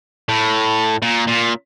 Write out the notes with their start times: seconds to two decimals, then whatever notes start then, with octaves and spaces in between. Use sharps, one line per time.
0.29 A2
1.03 A#2
1.27 A#2